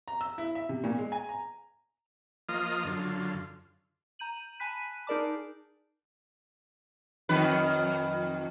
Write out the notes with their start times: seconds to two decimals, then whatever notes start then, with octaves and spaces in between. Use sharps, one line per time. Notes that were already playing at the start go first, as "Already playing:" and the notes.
0.08 A#5
0.21 E6
0.38 E4
0.55 E5
0.69 C3
0.84 A#2
0.98 G#3
1.12 G#5
1.29 A#5
2.49 F3 A#3 F4 D#5 D#6 F6
2.85 F#2 D3 F4
4.19 A#5 G6 D#7 F#7
4.60 G#5 A5 B5 F#6 B6 D#7
5.07 D#4 G#4 A#4 D5 A5 D6
7.29 F2 D#3 B4